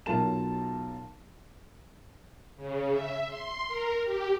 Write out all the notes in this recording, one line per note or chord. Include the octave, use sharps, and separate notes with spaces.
B1 F#3 F4 A#4 A5 E7
C#3
E5
C6
A#4
G4